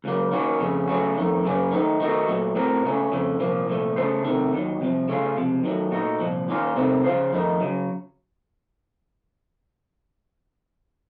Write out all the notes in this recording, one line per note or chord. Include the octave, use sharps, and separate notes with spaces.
C#2 C#3 F#3 A#3
D#3 A#3 C#4 F#4
F2 C#3 A3 C#4
C#3 F#3 A3 C#4 F#4
F2 D#3 A3
F#2 C#3 F#3 A#3 C#4
D#3 A3 C4 D#4
D#3 A3 D#4 F#4
A#2 F#3 A3
A2 A3 C4 F#4 A#4
C#2 C#3 A3 C#4
F2 C#3 F3 A3
C2 A#2 F3 A#3
C2 A#2 F3 A3
C#3 A3 C#4 A4 C5
C3 D#3 A3
D#2 D#3 F#3
C2 C3 F3
C#3 A3 C#4 F4
C#2 C3 F3
D#3 F#3 A3
A#2 A3 D#4 F#4
C2 A#2 F3
D#2 D#3 A#3 C#4 F4
C2 C3 D#3 A3 C4
C#3 F3 A#3 F4 C5
F2 D#3 A3 D#4
C#3 F#3